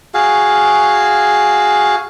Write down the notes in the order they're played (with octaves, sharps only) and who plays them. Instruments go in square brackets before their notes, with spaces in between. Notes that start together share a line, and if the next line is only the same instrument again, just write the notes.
[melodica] F#4 G#4 F5